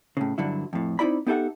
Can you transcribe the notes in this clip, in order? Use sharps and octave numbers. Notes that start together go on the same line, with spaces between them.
A2 C#3
G2 D3 F#3 E4
F2 A2
C4 D#4 E4 D5 B5
B3 D#4 G4 A4 E5 F#5